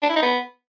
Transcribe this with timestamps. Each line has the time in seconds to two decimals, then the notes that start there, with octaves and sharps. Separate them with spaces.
0.03 D4
0.09 E4
0.16 D#4
0.22 B3